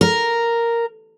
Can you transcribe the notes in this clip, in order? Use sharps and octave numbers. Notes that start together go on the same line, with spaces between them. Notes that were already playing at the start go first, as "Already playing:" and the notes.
A#4